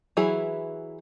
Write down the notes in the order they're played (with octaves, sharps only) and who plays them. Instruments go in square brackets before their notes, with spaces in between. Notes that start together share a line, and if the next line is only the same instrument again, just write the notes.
[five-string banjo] E3 F#3 E4 G#4